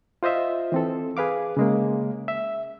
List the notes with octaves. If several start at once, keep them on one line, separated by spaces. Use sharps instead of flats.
F4 C5 D#5 E5
E3 C4 A4
G#4 B4 F5 D6
C#3 G#3 A#3
E5